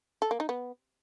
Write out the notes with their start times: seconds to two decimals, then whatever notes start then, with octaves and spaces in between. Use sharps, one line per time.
0.22 A4
0.31 A#3
0.40 D#4
0.49 B3